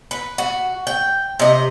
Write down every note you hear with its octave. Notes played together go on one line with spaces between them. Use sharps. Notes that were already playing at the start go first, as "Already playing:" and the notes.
B4
F#4
G5
C3 D#5